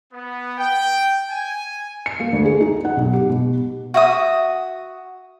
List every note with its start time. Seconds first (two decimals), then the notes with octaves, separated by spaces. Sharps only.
0.13 B3
0.58 G5
1.29 G#5
2.06 C#7
2.20 A#3
2.33 D2
2.45 G#4
2.60 D#4
2.85 F#5
2.97 B1
3.13 G4
3.30 B2
3.94 F#4 E5 D#6